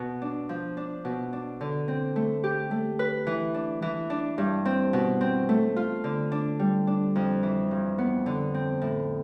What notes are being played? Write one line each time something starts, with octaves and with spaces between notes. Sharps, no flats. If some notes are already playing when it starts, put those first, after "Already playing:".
Already playing: B2
D4
F3
D4
B2
D4
D3
C4
A3
G4
A3
B4
E3
D4
E3
D4
G2
C4
B2
C4
A3
F4
D3
D4
G3
D4
F2
E3
G2
B3
D3
C4
A2